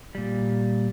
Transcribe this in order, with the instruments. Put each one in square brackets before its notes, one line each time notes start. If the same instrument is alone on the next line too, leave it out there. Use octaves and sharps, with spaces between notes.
[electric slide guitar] A#2 G3